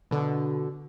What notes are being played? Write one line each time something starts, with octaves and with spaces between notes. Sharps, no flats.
B2 D3